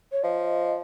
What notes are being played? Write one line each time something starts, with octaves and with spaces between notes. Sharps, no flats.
C#5
F3 D#5